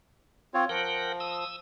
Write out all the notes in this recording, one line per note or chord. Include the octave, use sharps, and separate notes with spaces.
C4 F4 C#5
F3 A#4 F#5 G5
D#6 E6